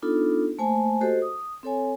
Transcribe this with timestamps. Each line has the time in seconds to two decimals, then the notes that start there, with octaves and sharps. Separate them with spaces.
0.02 B3 D4 D#4 F4 A4
0.59 A3 A#3 C5 G#5 A5
1.01 F#4 G4 A4 C5 D#5
1.22 D#6
1.63 C4 A4 C#5 G#5